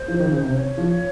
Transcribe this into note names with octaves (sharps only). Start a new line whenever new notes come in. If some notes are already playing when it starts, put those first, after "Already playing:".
Already playing: C5
F3
D#3
C#3
C3
C#5
F3